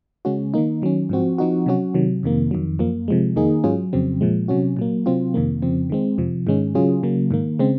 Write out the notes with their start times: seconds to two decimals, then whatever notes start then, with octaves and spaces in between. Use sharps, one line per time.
0.25 C#3 G#3 C#4 F#4
0.54 D#3 A#3 D#4
0.82 D#3 F#3 C#4
1.09 G#2 F3 C4 F#4
1.38 F3 C4 D#4 F#4
1.66 C3 F#3 C#4 F#4
1.94 C3 D#3 F#3
2.23 F2 C3 D#3 A#3
2.51 F2 D#3 F#3
2.79 F#2 F3 A#3
3.08 C3 F3 G#3
3.36 F2 D#3 A#3 D#4 G#4
3.64 G#2 F#3 C#4 F4 G#4
3.93 F2 C#3 F#3 C4
4.21 A#2 F3 G#3
4.48 C3 F#3 C#4 F#4
4.77 A#2 F#3 A#3
5.06 C3 F#3 C4 F4
5.34 F2 C3 D#3 A#3
5.62 F2 C#3 F3 C4
5.90 D#3 G#3 C4
6.18 F2 C3 F3
6.47 G#2 D#3 G#3 C#4
6.75 C#3 F#3 C#4 F4 G#4
7.03 C#3 F#3 A#3
7.31 G#2 D#3 A#3
7.59 C#3 G#3 C4